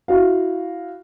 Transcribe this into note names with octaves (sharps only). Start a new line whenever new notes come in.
E4 F#4 F5